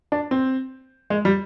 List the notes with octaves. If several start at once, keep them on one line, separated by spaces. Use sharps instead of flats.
D4
C4
G#3
G3